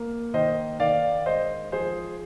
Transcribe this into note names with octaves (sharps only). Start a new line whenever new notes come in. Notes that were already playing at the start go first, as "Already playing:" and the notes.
Already playing: A#3
D#3 C5 D#5
D#3 D5 F5
G#3 C5 D#5
F3 G#4 C5